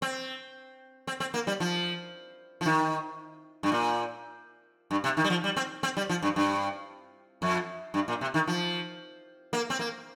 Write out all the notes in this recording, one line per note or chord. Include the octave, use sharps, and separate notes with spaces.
C4
C4
C4
A#3
G3
F3
F3
D#3
G2
A#2
G2
C3
D#3
G3
F3
G3
C4
C4
G3
F3
G2
G2
F2
G2
A#2
C3
D#3
F3
A#3
C4
A#3